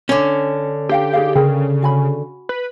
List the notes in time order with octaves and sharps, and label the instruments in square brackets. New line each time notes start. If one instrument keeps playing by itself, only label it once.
[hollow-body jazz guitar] D3 C#4
[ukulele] D4 F5 G5 [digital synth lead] G4
[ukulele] D#4 G#4 F5
[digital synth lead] C#3 [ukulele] G#4 A#4 G5
[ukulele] F#4 G#5 B5
[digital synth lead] B4